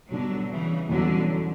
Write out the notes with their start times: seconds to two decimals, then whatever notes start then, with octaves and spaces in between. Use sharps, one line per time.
0.11 B2 D3 F#3 G3 D4
0.50 C#3 E3
0.89 E2 B2 D3 F#3 G3 C#4 F#4